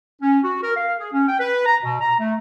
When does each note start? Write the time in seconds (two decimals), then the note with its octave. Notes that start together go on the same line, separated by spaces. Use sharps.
0.22 C#4
0.44 F#4
0.63 A#4
0.76 F5
0.99 G#4
1.13 C#4
1.28 G5
1.40 B4
1.66 A#5
1.83 B2
2.01 A#5
2.19 A3